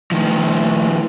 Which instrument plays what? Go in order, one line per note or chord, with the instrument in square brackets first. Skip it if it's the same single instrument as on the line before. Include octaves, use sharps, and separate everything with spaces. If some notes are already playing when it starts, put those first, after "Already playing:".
[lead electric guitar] D#3 F3 [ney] A3